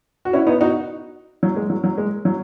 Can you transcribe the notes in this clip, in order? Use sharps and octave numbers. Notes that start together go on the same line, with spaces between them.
F#4
C#4 E4
B3 D#4
D#4 F#4
F#3
G#3
F#3
F#3
G#3
F#3